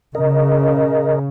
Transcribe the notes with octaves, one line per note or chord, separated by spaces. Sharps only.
C#3 A#4 D#5